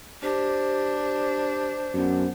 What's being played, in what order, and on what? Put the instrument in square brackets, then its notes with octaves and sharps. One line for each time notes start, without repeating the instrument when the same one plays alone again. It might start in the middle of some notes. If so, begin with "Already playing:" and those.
[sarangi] D4 [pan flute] G4 [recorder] C5
[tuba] F#2 [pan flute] B3